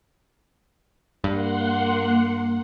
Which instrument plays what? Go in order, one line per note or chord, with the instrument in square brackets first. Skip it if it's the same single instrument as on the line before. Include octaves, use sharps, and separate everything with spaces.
[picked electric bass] G2 [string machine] A#3 F#5 C6